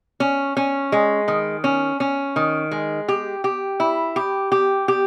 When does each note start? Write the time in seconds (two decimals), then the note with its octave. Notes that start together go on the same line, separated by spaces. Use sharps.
0.20 C#4
0.57 C#4
0.92 G#3
1.28 D#3
1.64 C#4
2.00 C#4
2.36 D#3
2.71 G#3
3.08 G4
3.44 G4
3.80 E4
4.16 G4
4.52 G4
4.88 G4